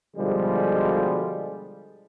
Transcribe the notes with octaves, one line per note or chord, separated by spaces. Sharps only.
B2 D3 F3 G3 G#3